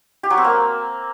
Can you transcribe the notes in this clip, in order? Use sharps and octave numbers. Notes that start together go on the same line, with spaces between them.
G4
F#3
C4
A#3